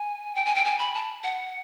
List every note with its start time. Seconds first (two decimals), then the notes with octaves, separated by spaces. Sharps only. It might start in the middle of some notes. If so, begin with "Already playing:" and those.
Already playing: G#5
0.35 G5
0.45 G#5
0.55 G5
0.65 G#5
0.79 B5
0.94 A5
1.23 F#5